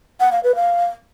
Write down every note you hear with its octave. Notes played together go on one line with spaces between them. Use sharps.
F#5
F5
B4
F5